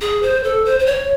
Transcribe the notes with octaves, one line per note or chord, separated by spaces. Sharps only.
G#4
C5
A4
C5
C5
C#5